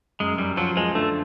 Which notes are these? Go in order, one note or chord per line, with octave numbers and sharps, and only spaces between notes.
F#2 G#3
F#2 G3
F3 F#3
F3 G#3
D3 A3